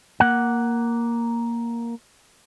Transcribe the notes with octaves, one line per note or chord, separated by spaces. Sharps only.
A#3 F#5